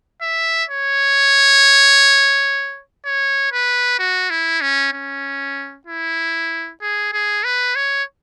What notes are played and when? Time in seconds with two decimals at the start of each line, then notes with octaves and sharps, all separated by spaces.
0.22 E5
0.69 C#5
3.05 C#5
3.52 B4
3.99 F#4
4.30 E4
4.61 C#4
4.93 C#4
5.87 E4
6.81 G#4
7.13 G#4
7.44 B4
7.75 C#5